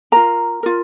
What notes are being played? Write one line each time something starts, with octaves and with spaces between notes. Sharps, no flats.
F4 A#4 A#5
F4 A#4